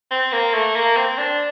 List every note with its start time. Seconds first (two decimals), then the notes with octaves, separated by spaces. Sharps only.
0.11 C4
0.32 A#3
0.54 A3
0.76 A#3
0.96 C4
1.18 D4